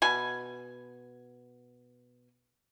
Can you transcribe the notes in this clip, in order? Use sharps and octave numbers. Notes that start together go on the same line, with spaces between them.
B2 G#5